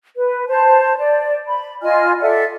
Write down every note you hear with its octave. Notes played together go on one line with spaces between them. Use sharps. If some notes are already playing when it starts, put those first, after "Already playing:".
B4
C5 A5
D5
B5
F4 D#5 G#5 F6
A4 D5 E5 F#5